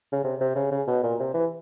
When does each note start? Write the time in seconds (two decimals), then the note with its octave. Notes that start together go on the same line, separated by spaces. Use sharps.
0.12 C#3
0.24 C3
0.40 C3
0.55 C#3
0.71 C#3
0.87 B2
1.03 A#2
1.19 C3
1.34 E3